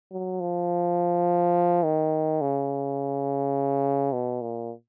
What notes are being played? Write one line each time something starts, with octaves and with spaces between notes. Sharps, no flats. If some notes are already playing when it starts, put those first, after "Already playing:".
F#3
F3
D#3
C#3
B2
A#2